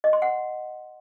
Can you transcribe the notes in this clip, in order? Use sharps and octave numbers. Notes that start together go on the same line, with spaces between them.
D#5
C6
F#5